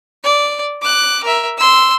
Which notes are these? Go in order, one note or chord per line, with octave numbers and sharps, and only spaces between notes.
D5
D6 F#6
A#4 E5
C6 E6